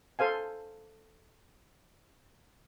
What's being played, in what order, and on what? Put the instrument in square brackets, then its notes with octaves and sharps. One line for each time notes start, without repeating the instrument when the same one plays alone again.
[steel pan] A4 C5 F5 G#5